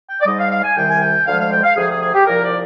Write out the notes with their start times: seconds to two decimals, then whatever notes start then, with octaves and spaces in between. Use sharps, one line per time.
0.10 G5
0.21 D5
0.26 G#2 G3 D#5
0.38 F5
0.51 F5
0.64 G#5
0.76 C2 C3 D#3 G3 G5
0.90 G#5
1.01 G5
1.26 D2 D3 F3 G#3 F5
1.39 F5
1.51 G5
1.63 F5
1.76 D2 C3 F3 G#4
1.89 G#4
2.01 G#4
2.14 G4
2.26 C2 A#2 F3 A#4
2.43 D5